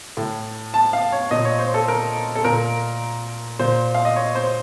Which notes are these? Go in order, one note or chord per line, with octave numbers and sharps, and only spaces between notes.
A2
A5
F5
C#5
A#2 D#5
C#5
C5
A4
A#4
A4
A#2 A#4
A#2 C5
F5
D#5
C#5
C5